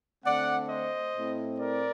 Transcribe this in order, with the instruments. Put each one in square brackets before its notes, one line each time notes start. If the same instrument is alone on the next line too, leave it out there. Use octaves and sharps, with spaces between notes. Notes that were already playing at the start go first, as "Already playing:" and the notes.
[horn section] D3 A3 C4 D5 F#5
C5 D#5
A2 A3 C4
A#4 D5